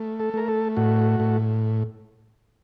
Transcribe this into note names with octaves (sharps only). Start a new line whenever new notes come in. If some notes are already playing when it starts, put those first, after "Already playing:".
Already playing: A3
A4
A3 A#4
A4
A2 F#4
A2